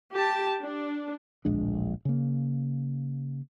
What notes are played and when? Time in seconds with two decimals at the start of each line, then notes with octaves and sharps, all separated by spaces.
0.14 G4 A5
0.61 D4
1.45 D1 A#1 G#3 D4
2.05 C#3 A#3